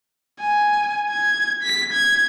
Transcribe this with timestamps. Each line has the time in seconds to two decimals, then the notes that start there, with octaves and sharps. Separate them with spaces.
0.40 G#5
1.10 G#6
1.64 B6
1.93 G#6